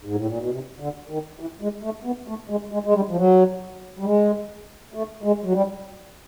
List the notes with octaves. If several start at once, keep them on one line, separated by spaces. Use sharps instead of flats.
G#2
A2
A#2
B2
C3
D3
D#3
E3
G#3
A3
B3
A3
G#3
G#3
G#3
G3
F3
F#3
G3
G#3
A3
G#3
F#3
G3